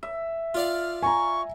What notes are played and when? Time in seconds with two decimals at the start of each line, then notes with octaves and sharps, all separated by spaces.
0.03 E5
0.54 F4 D5 F5 F6
1.02 G#5 A#5 C#6